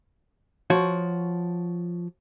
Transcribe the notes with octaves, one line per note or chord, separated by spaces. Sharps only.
F3 F#4 C#5